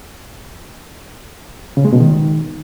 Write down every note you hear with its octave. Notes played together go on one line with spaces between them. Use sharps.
C#3
G#3
B2
D#3